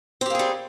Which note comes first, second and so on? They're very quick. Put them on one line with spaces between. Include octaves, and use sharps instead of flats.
C4 G4 A#3 G#4 G3